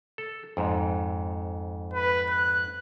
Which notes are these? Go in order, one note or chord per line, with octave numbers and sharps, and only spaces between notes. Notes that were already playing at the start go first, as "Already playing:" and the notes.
A4
F2 G#2
B4
F#6